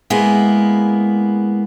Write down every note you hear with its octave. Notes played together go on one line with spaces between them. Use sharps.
G#3 A#3 B3 E4